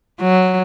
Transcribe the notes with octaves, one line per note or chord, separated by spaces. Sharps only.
F#3